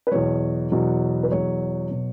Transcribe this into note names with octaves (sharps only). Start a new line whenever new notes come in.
B4
E2 B2 F#3 C#5
E2 B2 F#3
B4
E2 B2 F#3 C#5
B2 F#3